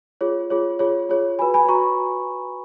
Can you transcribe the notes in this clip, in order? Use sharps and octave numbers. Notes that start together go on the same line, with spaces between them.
F4 G#4 C#5
F4 G#4 C#5
F4 G#4 C#5
F4 G#4 C#5
F#4 B4 G#5 B5
G#5 B5
F#4 A#5 C#6